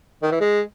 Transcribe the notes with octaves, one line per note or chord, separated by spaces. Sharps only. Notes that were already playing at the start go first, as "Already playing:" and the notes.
D#3
E3
G#3